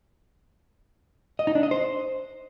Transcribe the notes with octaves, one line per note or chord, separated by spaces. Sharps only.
D#5
D#4
D4
D#5
C5